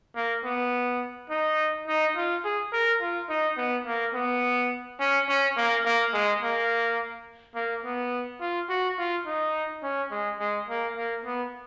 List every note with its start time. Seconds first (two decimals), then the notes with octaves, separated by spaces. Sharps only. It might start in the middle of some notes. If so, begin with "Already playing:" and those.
0.16 A#3
0.44 B3
1.30 D#4
1.87 D#4
2.16 F4
2.44 G#4
2.73 A#4
3.01 F4
3.29 D#4
3.57 B3
3.86 A#3
4.14 B3
5.00 C#4
5.29 C#4
5.57 A#3
5.86 A#3
6.13 G#3
6.43 A#3
7.55 A#3
7.84 B3
8.41 F4
8.69 F#4
8.98 F4
9.26 D#4
9.83 C#4
10.11 G#3
10.40 G#3
10.68 A#3
10.96 A#3
11.25 B3